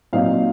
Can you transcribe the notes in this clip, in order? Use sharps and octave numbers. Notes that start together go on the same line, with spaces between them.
A#2 F#3 C4 D#4 F5